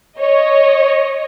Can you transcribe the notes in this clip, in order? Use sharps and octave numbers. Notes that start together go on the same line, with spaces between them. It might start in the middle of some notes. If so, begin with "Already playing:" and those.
C#5 D#5